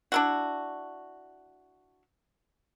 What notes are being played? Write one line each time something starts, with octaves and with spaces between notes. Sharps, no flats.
D4 E4 F#4